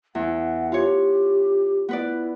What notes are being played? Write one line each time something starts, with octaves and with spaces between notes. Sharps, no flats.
E2 F#5
F4 G4 C#5
B3 E4 B4 D5